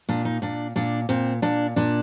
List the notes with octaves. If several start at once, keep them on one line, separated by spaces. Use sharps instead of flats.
A#2 D4
D#4
A#2 D4
A#2 D4
A#2 C4
A#2 D4
A#2 D4